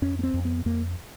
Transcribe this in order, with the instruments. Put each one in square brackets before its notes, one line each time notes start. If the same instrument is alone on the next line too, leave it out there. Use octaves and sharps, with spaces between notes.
[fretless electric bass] F2 C#4
B3
C4
F2
B3
F2 A#3